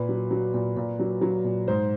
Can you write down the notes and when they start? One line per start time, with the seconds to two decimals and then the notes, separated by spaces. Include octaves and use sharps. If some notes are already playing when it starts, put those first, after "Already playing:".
Already playing: A#2 B4
0.09 F#3
0.31 F#3
0.54 A#2
0.77 A#2
0.99 F#3
1.21 F#3
1.44 A#2
1.68 G#2 C5